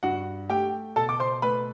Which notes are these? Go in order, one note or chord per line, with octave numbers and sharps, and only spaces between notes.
G2 F#4 F#5
A3 G4 G5
B2 A4 A5
D6
C5 C6
A3 B4 B5